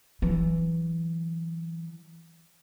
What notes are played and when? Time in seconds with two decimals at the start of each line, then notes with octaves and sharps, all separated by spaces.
0.22 E3 F#3